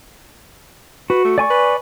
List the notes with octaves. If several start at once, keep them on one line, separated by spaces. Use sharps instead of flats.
F#4 B4
A3
D5 G#5 C#6
B4